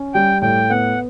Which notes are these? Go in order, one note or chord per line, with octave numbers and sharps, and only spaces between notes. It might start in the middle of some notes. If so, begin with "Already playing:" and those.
Already playing: C#4
G3 G5
A2 G5
B3 F#5